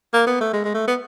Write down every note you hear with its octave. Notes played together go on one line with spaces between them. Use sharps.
A#3
B3
A3
G#3
G#3
A3
B3